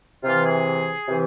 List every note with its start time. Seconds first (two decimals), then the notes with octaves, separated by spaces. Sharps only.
0.24 C3 E3 F4
0.45 G#4
1.09 C3 E3